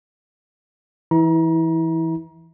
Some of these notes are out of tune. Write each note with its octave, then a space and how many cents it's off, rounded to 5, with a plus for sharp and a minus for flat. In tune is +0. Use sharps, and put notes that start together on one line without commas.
E3 +0 E4 -25 A#5 +35